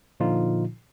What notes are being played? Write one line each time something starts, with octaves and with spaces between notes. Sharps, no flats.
A#2 D3 F3 D#4 F4